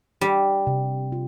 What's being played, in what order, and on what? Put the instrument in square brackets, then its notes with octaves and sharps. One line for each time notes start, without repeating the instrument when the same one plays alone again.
[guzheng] G3 [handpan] D4
[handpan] C3
F4